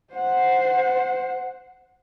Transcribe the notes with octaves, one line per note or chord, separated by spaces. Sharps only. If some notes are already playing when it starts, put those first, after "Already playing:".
C5 F#5